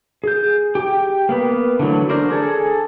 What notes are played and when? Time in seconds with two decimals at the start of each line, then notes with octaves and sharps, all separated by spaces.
0.24 G#4 G6
0.75 G4 G5
1.29 A#3 B3 B4
1.79 D3 E3 F#3 A3
2.09 D4 A#4 C5 D5
2.31 G#4 A4